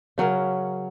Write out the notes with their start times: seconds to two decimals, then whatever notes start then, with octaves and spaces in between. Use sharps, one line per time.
0.18 C#3 F#3 C#4 A#4